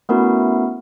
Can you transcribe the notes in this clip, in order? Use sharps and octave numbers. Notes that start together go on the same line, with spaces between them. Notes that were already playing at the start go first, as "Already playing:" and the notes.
A3 B3 C#4 E4 F#4 A#4